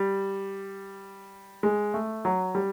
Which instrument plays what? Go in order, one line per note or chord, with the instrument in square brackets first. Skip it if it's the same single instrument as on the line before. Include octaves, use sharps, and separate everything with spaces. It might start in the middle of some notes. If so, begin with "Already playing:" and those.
Already playing: [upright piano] G3
G#3
A3
F#3
G3